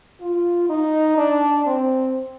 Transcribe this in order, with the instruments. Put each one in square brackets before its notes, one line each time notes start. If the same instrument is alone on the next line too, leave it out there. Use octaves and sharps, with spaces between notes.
[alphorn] F4
D#4
D4
C4